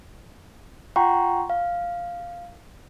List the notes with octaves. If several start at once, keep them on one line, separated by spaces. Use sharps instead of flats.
F4 F#5 G5 A#5 C6 C#6
F5